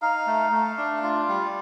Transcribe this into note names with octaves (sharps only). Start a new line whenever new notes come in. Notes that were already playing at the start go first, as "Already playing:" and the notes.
D#4 F5
A3
A3
D4
F4
G3